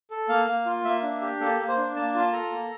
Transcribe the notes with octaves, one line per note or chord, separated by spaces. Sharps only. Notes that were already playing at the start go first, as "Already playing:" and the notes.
A4
A#3 F5
A#3
F4
A#3 E5
D4
G4
A#3 A4
A#3
C5
D4
A#3 A5
F4 A5
A4 A#5
A#3